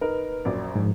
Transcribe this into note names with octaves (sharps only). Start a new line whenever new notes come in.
D#4 A#4 B4
A#1 F#2 D5
G#2 F3